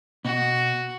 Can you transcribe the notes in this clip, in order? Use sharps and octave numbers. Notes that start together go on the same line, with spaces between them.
B2 F#4